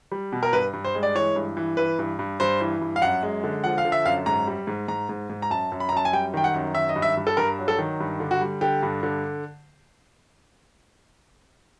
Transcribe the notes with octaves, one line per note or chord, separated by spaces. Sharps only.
G3
B2
A#4
G2 B4
G2
C5
G#3
D5
E3 C#5
G2
E3
E3 B4
G2
G2
G2 C5
E3
G2
F5
F#2 F#5
G#3
D3
F3 F#5
F5
D3
E5
F#2 F5
G#2 A#5
G3
G#2
G#2 A#5
G#2
G#2
A#5
F#2 A5
F#2
B5
A#5
F#2 A5
G#5
G3 G5
D#3 G5
F#5
F#2
D#3 E5
D#5
G2
E5
G2
A4
G2 A#4
F#3
A4
D#3
G2
D3
F#4
G3
D3 G4
G2
D3